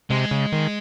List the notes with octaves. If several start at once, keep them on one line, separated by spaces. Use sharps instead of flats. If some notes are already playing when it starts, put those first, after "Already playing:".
C3 G#3
C#3
D#3